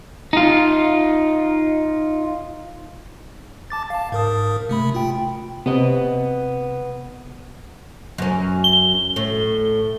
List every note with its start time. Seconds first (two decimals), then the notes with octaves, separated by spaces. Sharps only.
0.33 D#4 F4
3.70 A5 D6 A6
3.90 F5 A5
4.12 G#2 A#4 D#6
4.69 C3 A3 B5
4.95 F4 G5
5.66 C3 B3 D#5
8.18 F#2 C#4
8.64 G7
9.16 A2